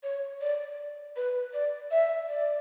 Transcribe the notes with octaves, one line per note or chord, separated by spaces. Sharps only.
C#5
D5
B4
D5
E5
D5